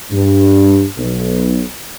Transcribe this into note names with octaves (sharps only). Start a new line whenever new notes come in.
G2
B1